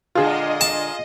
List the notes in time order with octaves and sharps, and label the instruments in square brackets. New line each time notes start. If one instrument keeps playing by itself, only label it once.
[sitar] A#2 D3 G#3 [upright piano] F4 G#4 [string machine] D#5
[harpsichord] A5